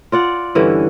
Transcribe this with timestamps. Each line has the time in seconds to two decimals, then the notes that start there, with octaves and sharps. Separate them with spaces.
0.12 F4 D5 F#5
0.55 G2 D3 E3 C#4